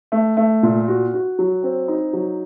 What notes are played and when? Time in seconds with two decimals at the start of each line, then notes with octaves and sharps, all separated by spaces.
0.12 A3
0.37 A3
0.63 A#2
0.88 F#4
1.14 F#4
1.39 F#3
1.63 C4
1.88 D#4
2.13 F#3